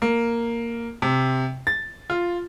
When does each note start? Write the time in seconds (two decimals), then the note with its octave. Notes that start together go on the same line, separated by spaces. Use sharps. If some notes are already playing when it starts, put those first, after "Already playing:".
0.02 A#3
1.02 C3
1.67 A6
2.10 F4